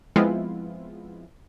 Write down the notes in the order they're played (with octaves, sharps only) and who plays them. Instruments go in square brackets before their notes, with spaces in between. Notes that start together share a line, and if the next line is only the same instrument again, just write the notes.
[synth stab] F3 G#3 B3 C4 E4 F4